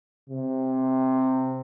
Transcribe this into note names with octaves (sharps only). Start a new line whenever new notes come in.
C3